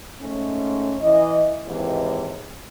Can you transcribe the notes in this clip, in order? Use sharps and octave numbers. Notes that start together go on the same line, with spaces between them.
G#2 A3 C#4
E3 D#5
D#2 G#2 C3 E3